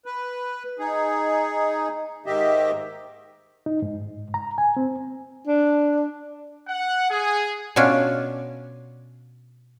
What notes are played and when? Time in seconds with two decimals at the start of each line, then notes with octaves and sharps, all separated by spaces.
0.06 B4
0.79 D#4 G#4
2.26 G#2 D#3 G4 D#5 E5
3.66 D#4
3.82 G#2
4.34 A#5
4.58 G#5
4.77 C4
5.47 D4
6.68 F#5
7.10 G#4
7.76 B2 C#4 D4 F4